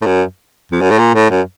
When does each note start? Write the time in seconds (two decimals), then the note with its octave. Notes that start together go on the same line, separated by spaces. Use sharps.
0.02 A2
0.06 F#2
0.72 F2
0.81 F#2
0.90 A2
0.99 A#2
1.15 A2
1.30 F#2